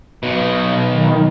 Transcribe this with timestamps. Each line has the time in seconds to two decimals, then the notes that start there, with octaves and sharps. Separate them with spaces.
0.23 B1 B2
0.92 D#3